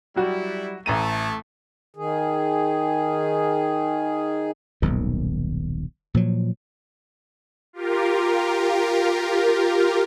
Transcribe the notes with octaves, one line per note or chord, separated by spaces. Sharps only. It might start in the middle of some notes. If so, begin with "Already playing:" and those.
F#3 G3 E4 F#4
A1 A3 A#5 D#7
D#3 G#4
D#1 B1 G#2 D#3
A#2 F3 F#3
F4 G4 A#4